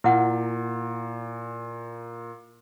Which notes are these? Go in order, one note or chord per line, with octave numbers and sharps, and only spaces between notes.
A#2 E4 F#5